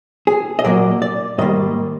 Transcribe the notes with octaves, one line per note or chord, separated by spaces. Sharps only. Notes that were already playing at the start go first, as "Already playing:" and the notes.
G#4
D#5
A#2 F#3 A#3 D5
D5
G#2 D#3 G3 A#3 D#5